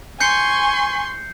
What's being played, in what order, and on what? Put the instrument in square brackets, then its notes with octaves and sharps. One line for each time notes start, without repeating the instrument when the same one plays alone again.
[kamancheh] G#5 C#6 [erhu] C6 [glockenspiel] G6 C7 C#7